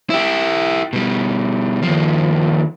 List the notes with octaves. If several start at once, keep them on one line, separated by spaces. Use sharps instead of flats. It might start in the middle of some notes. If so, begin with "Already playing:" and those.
E4 G4
B2 G3
D#2 F3